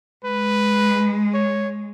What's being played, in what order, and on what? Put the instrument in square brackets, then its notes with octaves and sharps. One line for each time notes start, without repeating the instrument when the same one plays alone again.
[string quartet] G#3 [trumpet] B4
[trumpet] C#5